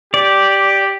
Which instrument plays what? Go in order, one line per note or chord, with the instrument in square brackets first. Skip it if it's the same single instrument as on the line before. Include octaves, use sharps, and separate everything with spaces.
[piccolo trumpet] G4 [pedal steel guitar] D5